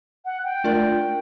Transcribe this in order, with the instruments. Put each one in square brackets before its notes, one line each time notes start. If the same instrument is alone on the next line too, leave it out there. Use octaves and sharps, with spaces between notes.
[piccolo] F#5
G5
[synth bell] A3 D4 F4 A#4 D5